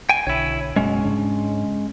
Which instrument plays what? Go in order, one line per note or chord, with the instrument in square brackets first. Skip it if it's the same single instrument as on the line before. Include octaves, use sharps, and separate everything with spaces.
[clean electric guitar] G5 G#5
[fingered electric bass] B1 D3 [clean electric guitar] E4 C#5
[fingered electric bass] F#1 B2 F#3 [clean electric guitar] G#3 C#4
[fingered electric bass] G#2 C#3 D4